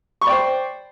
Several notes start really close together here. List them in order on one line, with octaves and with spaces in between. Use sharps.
C#6 B5 D5 G5 C5